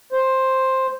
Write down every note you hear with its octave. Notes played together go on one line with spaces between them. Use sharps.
C5